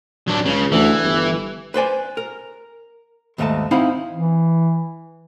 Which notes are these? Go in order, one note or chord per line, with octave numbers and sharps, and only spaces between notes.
F#3 D4
C#2 C#3
D2 E3
G1
B4 C5 D5 G#5
A#4
D#2 G#2 A3 A4 D#5 A5
C4 D#4 E4 F5 F#5 B5
E3